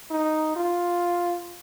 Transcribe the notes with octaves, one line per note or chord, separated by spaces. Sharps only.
D#4
F4